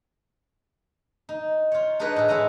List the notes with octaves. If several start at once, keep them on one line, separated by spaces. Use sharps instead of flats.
D#4
F4 C#5
D4 D#4 G#4 A#4 B4 C#5
A2 G#4
G#3 E4 F#5 G#5 A#5